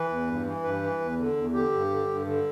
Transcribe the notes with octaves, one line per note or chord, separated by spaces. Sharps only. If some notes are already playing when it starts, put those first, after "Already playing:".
Already playing: E3 B4
E2
G2
E3
G2 B4
E3
E2
D3
E2
D3 G4
G2
D3
G2
D3